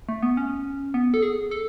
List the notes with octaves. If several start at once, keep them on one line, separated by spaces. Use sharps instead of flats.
A3
B3
C#4
B3
A4
G#4
A4